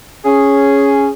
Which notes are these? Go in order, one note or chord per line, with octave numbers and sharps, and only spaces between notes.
C#4 G#4